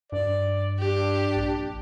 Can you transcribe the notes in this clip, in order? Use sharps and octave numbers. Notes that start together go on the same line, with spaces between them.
G2 D5
D4 G4
A#1